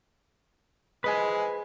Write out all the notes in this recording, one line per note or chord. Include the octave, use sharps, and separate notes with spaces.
E3 F3 G#3 B4 G#5